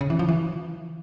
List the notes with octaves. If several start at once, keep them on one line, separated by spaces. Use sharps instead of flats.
C#3
E3
F3
E3